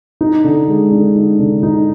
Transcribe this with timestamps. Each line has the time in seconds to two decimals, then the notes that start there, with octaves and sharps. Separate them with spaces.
0.21 D#4
0.44 D3
0.68 G#3
0.91 D3
1.16 D#4
1.39 D3
1.63 D#4